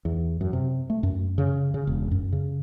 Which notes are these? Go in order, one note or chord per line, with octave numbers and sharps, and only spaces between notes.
E2
F#2
C3
A3
F#2
C#3
C#3
E1
F#2
C#3